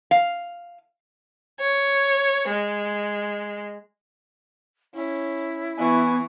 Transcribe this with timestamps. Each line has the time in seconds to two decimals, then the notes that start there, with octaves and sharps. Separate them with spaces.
0.11 F5
1.60 C#5
2.49 G#3
4.94 C#4 E4
5.78 E3 B3 G#5 C#6